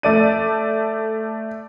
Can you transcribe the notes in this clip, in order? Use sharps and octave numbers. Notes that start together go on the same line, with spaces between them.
A3 D5 D#7